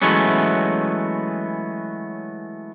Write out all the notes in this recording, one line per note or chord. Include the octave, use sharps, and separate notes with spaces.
E3 F#3 G#3 A3 B3 C#4